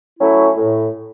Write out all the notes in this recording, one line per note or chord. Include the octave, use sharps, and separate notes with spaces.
F#3 A3 C#4 E4
A2